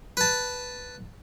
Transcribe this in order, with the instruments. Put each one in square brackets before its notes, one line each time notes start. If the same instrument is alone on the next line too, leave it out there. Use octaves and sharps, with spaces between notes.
[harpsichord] B4 A5